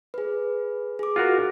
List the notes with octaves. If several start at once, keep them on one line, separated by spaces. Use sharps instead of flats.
G#4 B4
G#4 D6
F4 F#4 A#4